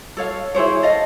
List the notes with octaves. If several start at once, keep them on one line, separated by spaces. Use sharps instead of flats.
A4 C#5 F5
E4 G#4 C5 C#5
A4 D#5 F5